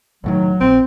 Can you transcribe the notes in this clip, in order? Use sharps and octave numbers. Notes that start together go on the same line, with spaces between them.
C#2 A2 D#3 F#3
A#1 C4